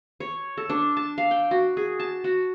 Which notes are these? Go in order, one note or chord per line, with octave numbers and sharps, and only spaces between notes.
C#5
A4
D4
A5
F5
G5
F#4
G#4
A5
F#4